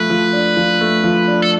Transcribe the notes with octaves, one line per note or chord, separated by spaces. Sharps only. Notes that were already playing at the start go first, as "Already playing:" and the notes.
Already playing: F3 A3 B4
F3
D4
F3
A3
F3
D4
A4